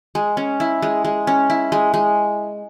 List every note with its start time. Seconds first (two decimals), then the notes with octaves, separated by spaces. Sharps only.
0.15 G#3
0.37 C#4
0.60 E4
0.82 G#3
1.05 G#3
1.27 C#4
1.50 E4
1.72 G#3
1.94 G#3